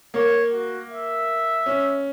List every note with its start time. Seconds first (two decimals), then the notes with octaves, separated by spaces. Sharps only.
0.14 A#3 C#5
0.52 F#4
0.90 E5
1.66 C#4